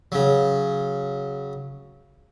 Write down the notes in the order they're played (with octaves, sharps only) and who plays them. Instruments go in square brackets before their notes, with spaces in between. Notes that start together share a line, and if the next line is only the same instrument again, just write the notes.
[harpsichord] C#3 F#3